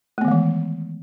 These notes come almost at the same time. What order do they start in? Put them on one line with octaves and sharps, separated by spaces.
A3 B3 D#3 G#3 E3